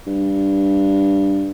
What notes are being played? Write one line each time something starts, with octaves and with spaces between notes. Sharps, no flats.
G2